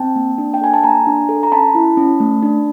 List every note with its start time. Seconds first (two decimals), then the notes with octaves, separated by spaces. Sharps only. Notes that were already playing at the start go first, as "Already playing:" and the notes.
Already playing: C4 G5 A5
0.16 A#3
0.38 D4
0.54 G5
0.61 A4 G#5
0.74 A5
0.83 A#3 G#5 A#5
1.07 D4
1.29 A4
1.43 A#5
1.52 C#4 A5 B5
1.75 E4
1.97 C#4
2.20 A3
2.42 D4